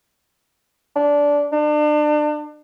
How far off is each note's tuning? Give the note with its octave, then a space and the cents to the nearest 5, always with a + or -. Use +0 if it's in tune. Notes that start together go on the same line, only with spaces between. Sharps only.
D4 -15
D4 +35